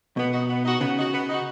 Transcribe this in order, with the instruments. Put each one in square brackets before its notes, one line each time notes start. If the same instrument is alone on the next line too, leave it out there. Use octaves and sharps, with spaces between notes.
[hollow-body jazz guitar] B2 [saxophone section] B3
[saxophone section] D#4 F#4
B3
D#4 F#4
[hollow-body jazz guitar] C#3 [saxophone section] B3
[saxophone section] D#4 F#4
B3
D#4 F#4